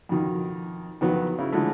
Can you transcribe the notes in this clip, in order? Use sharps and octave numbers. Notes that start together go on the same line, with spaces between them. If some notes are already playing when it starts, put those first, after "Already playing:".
F2 B2 D#3
F2 D#3 F#3 B3
C#3 E4
D3 E3 F3 G#3 A3